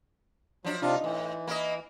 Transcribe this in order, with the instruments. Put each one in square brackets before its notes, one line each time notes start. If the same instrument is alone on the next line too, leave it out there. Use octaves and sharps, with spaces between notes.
[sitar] F3 D4 [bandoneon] F#3
[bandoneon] C3 D4 F4 [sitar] D#4
[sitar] A2 [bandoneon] E3
[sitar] A#3 E4 D#5